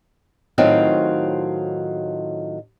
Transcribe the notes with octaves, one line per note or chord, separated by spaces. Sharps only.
A2 D#3 F#3 C4 F4